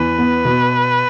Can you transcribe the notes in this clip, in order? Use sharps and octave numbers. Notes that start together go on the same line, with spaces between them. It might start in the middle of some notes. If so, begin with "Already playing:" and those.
Already playing: E2 B4
B3
B2